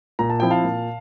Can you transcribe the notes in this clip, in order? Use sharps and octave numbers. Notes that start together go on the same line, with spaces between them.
A#2 A#5
A5
F3 C4 E4 G5
F5 A5
A#2